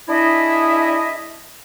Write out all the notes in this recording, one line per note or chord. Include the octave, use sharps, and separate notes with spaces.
D4 E4 G#4 D#5 E5